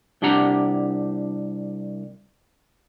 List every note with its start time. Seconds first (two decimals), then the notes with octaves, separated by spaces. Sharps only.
0.22 C2 D4 G4 F#5 A#5